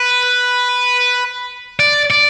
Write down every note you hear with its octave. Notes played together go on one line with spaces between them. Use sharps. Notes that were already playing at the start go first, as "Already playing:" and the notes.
Already playing: B4
D5
D5